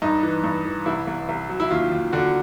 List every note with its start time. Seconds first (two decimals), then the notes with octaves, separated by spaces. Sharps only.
0.02 G2 D#4
0.23 E3
0.44 G2
0.65 E3
0.86 C2 E4
1.07 C2
1.29 C2
1.49 F#3
1.60 E4
1.71 D#2 F4
1.92 D#2
2.13 D3 F#4